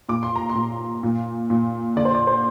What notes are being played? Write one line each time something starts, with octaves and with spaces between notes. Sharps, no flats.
A#2 D6
C6
A#5
C6
A#2
A#2
A#2
D3 D5
C5
D5
C5